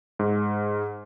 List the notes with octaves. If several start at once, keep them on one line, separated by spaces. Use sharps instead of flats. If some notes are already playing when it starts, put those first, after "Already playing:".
G#2